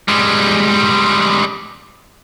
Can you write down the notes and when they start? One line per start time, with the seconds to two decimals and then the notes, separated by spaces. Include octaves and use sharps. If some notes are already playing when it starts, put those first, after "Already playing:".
0.08 G3 G#3